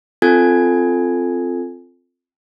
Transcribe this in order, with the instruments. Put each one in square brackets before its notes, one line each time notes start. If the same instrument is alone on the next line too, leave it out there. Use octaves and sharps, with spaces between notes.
[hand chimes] C4 F4 A4 G#5 G#6